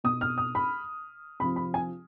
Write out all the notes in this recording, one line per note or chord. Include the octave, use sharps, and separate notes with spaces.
B2 D#6
F6
D#6
B5
C3 F3 B5
B5
G#5